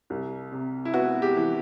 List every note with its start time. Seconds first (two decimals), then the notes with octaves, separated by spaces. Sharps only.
0.10 C2
0.52 C3
0.85 E4
0.94 B3 F#4
1.22 G4
1.37 E3